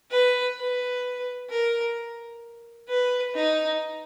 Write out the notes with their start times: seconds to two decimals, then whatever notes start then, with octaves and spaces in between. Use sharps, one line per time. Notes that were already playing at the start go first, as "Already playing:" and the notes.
0.11 B4
0.57 B4
1.50 A#4
2.88 B4
3.35 D#4